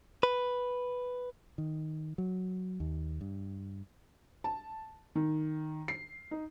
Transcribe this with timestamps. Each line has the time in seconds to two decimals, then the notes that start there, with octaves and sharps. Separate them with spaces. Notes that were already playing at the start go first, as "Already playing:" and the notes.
0.23 B4
1.58 D#3
2.18 F#3
2.80 D#2
3.21 G2
4.44 A5
5.16 D#3
5.88 C7
6.31 D#4